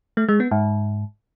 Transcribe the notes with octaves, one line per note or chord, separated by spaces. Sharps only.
A3
G#3
B3
G#2